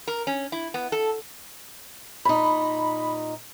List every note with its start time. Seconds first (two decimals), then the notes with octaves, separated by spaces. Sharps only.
0.08 A#4
0.27 C#4
0.52 E4
0.74 B3
0.92 A4
2.25 A#2 D#4 B5